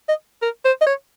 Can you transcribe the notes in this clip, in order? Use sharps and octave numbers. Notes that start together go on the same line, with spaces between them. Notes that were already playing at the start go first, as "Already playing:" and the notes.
D#5
A#4
C5
D#5
C#5